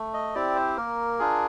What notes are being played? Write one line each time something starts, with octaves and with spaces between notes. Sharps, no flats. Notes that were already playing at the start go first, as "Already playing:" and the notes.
Already playing: A3
D#5
C4 E4 G4 D5
C5
A#3 A#4
D4 F4 G#4